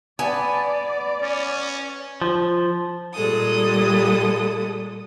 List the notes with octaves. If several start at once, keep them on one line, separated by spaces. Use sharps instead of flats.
B3 D5 G#5
C#4
F3
A#2 G3 G#3 A4 D#6